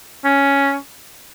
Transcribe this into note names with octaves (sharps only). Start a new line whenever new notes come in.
C#4